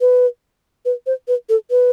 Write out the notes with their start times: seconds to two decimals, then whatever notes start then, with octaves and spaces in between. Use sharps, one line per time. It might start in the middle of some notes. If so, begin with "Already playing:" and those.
0.01 B4
0.85 B4
1.06 C5
1.28 B4
1.49 A4
1.71 B4